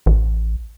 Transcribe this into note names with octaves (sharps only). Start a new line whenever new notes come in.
A1